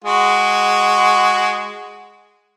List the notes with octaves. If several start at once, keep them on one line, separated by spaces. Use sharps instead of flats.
G#3 F#4